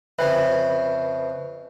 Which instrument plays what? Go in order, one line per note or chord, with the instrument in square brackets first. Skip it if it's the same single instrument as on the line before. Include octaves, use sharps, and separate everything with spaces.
[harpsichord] F2 C#3 F3 [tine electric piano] B4 [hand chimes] E5